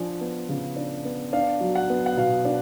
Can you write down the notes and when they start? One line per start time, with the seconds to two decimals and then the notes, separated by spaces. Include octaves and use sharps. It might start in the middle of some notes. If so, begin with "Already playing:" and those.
Already playing: F3 D4 G#5
0.21 B3
0.49 C#3
0.76 D4
1.05 B3
1.33 D4 F5
1.61 F#3
1.75 F#5
1.90 B3
2.06 F#5
2.17 B2 F5
2.45 D4